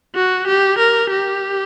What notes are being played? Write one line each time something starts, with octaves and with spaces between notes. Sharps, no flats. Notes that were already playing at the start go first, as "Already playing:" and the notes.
F#4
G4
A#4
G4